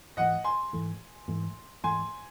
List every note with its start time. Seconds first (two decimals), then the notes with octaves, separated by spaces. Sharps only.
0.17 G#2 E3 A3 D#5 F#5
0.44 G#5 C6
0.73 G#2 E3 A3
1.28 G#2 E3 A3
1.84 G#2 E3 A3 G#5 C6